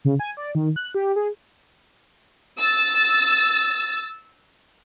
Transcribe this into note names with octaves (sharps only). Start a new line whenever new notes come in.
C#3
G#5
D5
D#3
F#6
G4
G#4
E6 A6